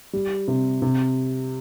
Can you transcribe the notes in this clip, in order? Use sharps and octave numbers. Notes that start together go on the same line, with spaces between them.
G3
C3
C3